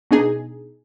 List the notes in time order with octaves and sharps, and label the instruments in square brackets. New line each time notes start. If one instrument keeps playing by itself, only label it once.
[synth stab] B2 D4 D#4 G#4